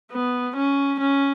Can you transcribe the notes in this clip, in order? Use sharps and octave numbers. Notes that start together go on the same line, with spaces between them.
B3
C#4
C#4